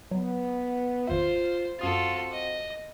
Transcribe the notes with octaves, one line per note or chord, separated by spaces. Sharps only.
F#3 B3
G#1 E2 F4 C5 E5
F#2 C4 F4 F#4 A4 D#6 A6
D#5